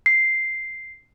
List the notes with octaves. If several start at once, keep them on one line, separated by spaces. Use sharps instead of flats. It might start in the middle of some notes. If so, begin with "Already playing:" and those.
C7